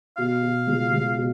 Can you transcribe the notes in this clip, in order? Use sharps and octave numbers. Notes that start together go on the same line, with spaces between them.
B2 F5
B2
C#2
C#2
B2